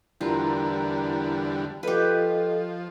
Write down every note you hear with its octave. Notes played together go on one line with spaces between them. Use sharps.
E2 D3 G3 E4 F4 A#4 A#5
F3 F4 G4 A4 B4 D#5